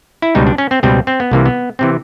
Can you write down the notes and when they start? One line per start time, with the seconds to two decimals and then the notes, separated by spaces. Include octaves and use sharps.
0.22 E4
0.35 C#2 B2 G3 D#4
0.46 D4
0.58 C#4
0.71 C4
0.83 C#2 B2 G3 C4
1.07 C4
1.20 B3
1.31 C2 C3 E3 A#3
1.46 B3
1.79 C3 E3 C4